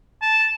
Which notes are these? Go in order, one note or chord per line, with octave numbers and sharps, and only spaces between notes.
A5